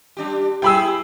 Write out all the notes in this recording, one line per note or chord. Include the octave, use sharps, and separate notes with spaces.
G3 D4 G4
E4 G4 G#4 G5 B5 E6